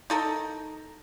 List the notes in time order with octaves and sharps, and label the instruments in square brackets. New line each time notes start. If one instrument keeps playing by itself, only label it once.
[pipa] D#4 A4 A#4